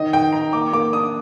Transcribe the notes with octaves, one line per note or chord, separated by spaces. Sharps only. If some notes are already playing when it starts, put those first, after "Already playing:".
Already playing: D#3 D#5
D#3 G5
D#3 A#5
A#3 D6
A#3 D6
D4 D#6